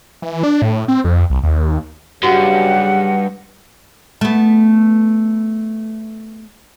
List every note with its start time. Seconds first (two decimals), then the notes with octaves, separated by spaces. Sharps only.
0.22 E3
0.43 D4
0.62 A2
0.88 C4
1.04 F2
1.30 C2
1.43 D#2
2.23 G2 C#3 F#3 F#4 G4 F#5
4.21 A3 B3